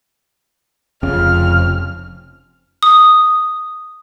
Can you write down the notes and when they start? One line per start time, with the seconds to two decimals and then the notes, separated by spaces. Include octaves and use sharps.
1.03 F1 F2 C#3 F6
2.83 D#6